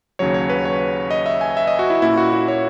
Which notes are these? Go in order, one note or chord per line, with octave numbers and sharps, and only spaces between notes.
D#2 C#3 F#3 C#5
C#5
B4
C#5
D#5
E5
G#5
E5
D#5
F#4
E4
A#2 A#3 C#4 E4
F#4
F#4
C#5